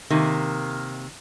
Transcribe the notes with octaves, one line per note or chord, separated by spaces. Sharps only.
C3 D#3 A#3